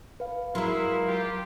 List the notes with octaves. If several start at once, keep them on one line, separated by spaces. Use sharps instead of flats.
B4 F5
F#3 G#3 E4 A#4 F5 C6
F4 G4